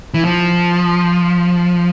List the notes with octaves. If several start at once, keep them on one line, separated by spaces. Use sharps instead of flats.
E3
F3